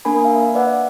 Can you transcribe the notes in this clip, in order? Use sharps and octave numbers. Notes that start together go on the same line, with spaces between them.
A#3 D4 A#4 G#5 B5
E5 F5
B4 D5 E5 F#5